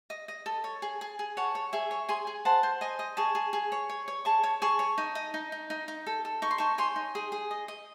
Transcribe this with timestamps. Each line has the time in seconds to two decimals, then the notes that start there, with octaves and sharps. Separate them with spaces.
0.10 D#5
0.28 D#5
0.46 A4
0.64 C#5
0.82 G#4
1.01 G#4
1.19 G#4
1.37 C#5 F#5 A5
1.55 C#5
1.73 G#4 E5 G#5
1.91 C#5
2.09 G#4 G#5 C6
2.27 G#4
2.45 C5 F#5 A5
2.63 C5
2.81 D#5 G#5 C6
2.99 D#5
3.17 G#4 A5 C#6
3.35 G#4
3.53 G#4
3.72 C#5
3.90 C#5
4.08 C#5
4.25 G#4 A5 C#6
4.44 C#5
4.62 G#4 A5 C#6
4.79 C#5
4.98 D#4
5.15 D#5
5.34 D#4
5.52 D#4
5.70 D#4
5.88 D#4
6.07 A4
6.25 A4
6.42 D#4 C#6
6.51 C6
6.58 D#4 A5 C#6
6.78 C#5 G#5 C6
6.96 D#4
7.15 G#4
7.32 G#4
7.51 D#5
7.68 D#5